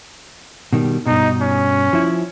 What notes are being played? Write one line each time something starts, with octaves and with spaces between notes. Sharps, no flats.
B2 D#3 G3
G2 B2 D#4
C#4
F3 E4